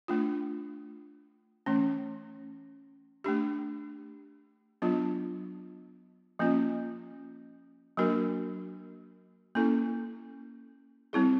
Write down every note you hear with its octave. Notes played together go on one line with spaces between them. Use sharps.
A3 D4 F4
E3 A3 C#4
A3 D4 G4
F#3 B3 D4 F4
F3 A#3 C#4 F4
F#3 A#3 D4 F#4 A#4
A#3 C#4 E4 A4
G3 C4 E4 G#4